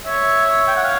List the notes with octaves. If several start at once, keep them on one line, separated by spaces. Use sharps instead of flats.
C#5 E5
C#5
G5
F#5
F5